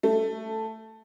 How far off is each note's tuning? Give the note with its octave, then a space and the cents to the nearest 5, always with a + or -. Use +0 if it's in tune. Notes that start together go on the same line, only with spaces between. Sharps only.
A3 +5